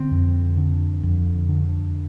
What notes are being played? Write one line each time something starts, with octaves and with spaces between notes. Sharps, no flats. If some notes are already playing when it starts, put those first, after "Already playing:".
Already playing: D3 C4
F2
D3
F2
D3